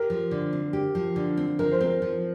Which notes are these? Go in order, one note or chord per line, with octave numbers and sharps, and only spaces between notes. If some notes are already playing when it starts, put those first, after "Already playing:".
Already playing: G4 A#4
F3
D3
C4
G4
F3
D3
C4
F3 A#4
C5
C4 A#4
F3